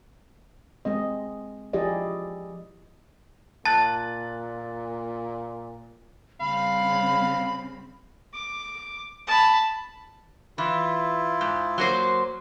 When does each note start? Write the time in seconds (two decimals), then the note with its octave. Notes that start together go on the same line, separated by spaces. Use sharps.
0.85 G#3 C4 D#5
1.73 F3 E4 G4 G#4 D5 D#5
3.65 A#2 A5 F#6 A6
6.40 C#3 G3 C4 F5 B5
8.33 D6
9.27 A5 B5
10.58 E3 E4 F4
11.41 G#2
11.78 F#3 A#3 C5